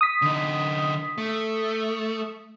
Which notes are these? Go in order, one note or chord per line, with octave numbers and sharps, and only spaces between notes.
D#6 B6
D3 D#4
A3